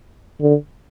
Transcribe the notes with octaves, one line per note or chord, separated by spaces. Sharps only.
D3